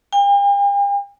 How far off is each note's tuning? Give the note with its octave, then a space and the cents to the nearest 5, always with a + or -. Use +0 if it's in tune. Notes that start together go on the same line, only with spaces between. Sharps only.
G5 +45